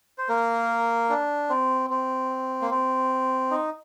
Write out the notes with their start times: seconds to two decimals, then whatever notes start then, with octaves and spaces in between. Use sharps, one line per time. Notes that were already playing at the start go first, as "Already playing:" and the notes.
0.18 C5
0.29 A#3 A#4
1.09 D4
1.49 C4
1.90 C4
2.62 A#3
2.71 C4
3.51 D#4